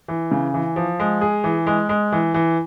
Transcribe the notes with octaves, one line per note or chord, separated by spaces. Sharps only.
E3
C#3
E3
F3
G#3
G#4
E3
G#3
G#3
E3
E3